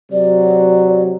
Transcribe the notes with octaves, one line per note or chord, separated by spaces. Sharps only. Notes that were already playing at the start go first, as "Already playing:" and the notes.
C3 F#3 D5